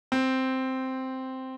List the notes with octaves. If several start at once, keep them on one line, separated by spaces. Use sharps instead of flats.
C4